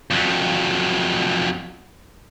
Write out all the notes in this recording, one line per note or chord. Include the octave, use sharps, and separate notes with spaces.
F2 F#3